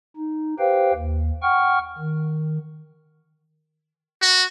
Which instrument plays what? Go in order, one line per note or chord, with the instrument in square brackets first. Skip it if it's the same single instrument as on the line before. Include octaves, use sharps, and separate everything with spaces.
[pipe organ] D#4
G4 B4 C5 F5 G5
D#2
F#5 G5 C#6 F6
D#3
[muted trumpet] F#4